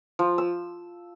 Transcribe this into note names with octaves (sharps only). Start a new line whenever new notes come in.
F3
E6